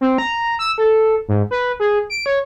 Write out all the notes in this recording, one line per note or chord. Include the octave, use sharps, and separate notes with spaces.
C4
A#5
E6
A4
G#2
B4
G#4
D7
C#5